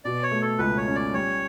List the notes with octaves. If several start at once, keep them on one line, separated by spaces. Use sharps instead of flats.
B2 D5
C#5
A3
A4
C#2 B4
C#5
C#4
D5
G3 C#5